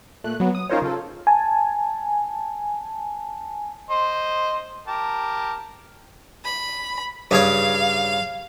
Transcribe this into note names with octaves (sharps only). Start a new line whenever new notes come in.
A#2 A3 F#6
F#3 B3
D#6
C#4 D#4 F4 A#4 C5 C#5
C#3 F4 A4
G#5 A5
C5 D#5
G4 A#4 A5
B5
G2 C#3 C#5 F5